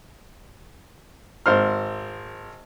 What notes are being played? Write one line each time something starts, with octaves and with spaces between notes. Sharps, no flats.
G#1 C5 F6